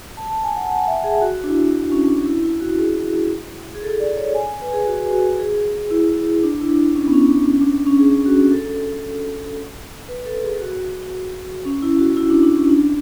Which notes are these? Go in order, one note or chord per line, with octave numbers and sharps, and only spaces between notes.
A5
A5
G#5
F#5
F#5
E5
G#4
F#4
D4
E4
D4
C#4
D4
E4
E4
F#4
G#4
G#4
A4
D5
C#5
G#5
B4
G#4
F#4
F#4
G#4
E4
D4
E4
D4
C#4
B3
C#4
D4
C#4
D4
C#4
G#4
F#4
A4
B4
A4
G#4
F#4
C#4
E4
F#4
E4
D4
D4
C#4
D4